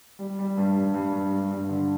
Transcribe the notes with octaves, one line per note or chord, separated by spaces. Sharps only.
G3
G3
G2
G2
G2
G2
G2
G2
D3